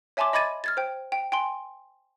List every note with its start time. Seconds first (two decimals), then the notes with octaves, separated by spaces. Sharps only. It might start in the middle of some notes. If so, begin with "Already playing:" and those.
0.17 C#5 E5 G#5 A5 C6 D6
0.33 D#5 B5 D6 G#6 A6 D#7
0.64 F6 G#6 A6
0.77 C5 G5
1.12 G5
1.32 G5 G#5 C6